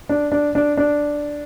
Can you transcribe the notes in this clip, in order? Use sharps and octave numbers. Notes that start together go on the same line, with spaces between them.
D4
D4
D4
D4